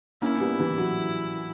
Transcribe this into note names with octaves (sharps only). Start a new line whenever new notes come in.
A#3 C#4 E4
C#4
G3 B3
E3 G3
F#3